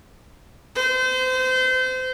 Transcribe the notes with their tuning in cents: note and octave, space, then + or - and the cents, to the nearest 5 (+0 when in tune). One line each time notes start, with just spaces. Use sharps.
C5 -30